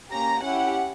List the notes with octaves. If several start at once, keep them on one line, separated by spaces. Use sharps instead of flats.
A#3 C#4 G4 A#5
C#4 E4 G4 F#5